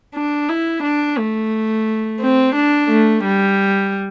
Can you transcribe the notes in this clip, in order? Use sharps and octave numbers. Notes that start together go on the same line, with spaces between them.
D4
E4
D4
A3
C4
D4
A3
G3